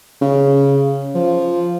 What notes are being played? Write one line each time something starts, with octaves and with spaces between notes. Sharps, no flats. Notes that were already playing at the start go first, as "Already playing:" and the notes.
C#3
F3